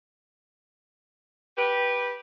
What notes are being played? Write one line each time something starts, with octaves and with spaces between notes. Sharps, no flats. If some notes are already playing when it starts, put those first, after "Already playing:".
G4 B4